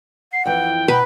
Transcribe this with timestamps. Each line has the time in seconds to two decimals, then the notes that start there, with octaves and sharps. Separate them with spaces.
0.33 F#5 C7
0.46 F2 E3 G5
0.88 B2 B4 A#5 B5